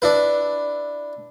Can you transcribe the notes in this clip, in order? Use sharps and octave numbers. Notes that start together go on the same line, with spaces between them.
D4 E4 B4